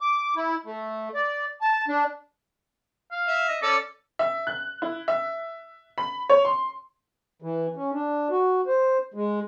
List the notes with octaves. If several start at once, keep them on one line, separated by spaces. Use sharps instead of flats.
D6
E4
A3
D5
A5
D4
F5
E5
D#5
C#4 A4 D5 D6
E5
F#6
E4
E5
B5
C#5
C6
E3
C#4
D4
F#4
C5
G#3